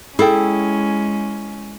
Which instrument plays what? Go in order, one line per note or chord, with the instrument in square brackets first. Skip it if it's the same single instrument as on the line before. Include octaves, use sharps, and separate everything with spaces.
[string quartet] G#3 C#4 [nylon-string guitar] E4 [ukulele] G#4 A4 G5